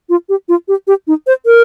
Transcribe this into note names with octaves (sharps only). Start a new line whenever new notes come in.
F4
G4
F4
G4
G4
D#4
C5
A#4